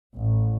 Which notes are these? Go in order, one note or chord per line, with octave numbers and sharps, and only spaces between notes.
A1